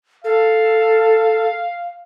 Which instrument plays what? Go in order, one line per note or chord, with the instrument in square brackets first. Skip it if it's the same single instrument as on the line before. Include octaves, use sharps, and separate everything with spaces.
[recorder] A4 [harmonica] F5